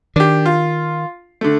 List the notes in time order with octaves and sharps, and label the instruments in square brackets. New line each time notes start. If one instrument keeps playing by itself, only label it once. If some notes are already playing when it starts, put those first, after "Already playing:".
[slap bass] D#3 [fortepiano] D4 G4
[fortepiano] F4
D3 A3